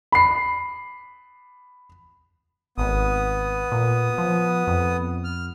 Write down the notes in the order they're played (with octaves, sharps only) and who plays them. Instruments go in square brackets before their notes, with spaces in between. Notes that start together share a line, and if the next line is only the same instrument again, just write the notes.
[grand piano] B5 C7
[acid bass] G#1 [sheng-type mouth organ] B3 D#6
[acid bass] A#2
F3
F2
[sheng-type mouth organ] F6